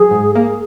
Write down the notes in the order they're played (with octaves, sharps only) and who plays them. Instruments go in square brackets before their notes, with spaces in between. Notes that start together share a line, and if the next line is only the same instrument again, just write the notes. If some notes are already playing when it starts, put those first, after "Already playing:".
Already playing: [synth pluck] F#3 [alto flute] G#4
[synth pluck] G#2
[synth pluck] A#3 [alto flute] G#4